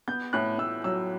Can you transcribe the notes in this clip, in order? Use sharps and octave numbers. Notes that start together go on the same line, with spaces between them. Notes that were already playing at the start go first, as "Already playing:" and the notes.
B3 G6
A2 F#6
A2 E6
F#3 E6